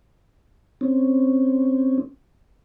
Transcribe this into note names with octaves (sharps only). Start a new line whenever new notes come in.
C4 C#4